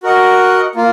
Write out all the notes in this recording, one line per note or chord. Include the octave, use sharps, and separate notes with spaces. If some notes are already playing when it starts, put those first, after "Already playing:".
F#4 A#4 D#5 F#5
A#3 F4